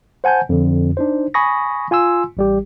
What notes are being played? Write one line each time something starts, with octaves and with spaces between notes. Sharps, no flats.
C5 F#5 G#5 A5 G6
F2 D3
D4 D#4 C5
G#5 B5 C#6 D#6 A#6
F4 G#5 C6 E6
A1 G3 G4